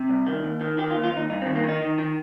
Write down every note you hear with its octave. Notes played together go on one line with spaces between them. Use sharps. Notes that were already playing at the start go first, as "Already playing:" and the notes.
Already playing: C3
C2
D#3
D#2
D#3
D#3 G4
F4
D#2
F4
D#2
D#4
G2 D#4
C4
D#3
A#3
D#3
D#4
D#3
D#3